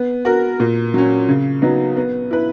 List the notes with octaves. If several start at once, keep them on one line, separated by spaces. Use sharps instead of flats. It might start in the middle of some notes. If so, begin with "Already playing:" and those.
Already playing: B3
F#4 A#4
A#2
F#3 C#4
C#3
F#3 B3 D#4
B3
E4 B4